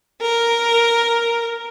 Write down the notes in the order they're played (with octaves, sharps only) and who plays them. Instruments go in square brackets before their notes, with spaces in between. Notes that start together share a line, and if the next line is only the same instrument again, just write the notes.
[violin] A#4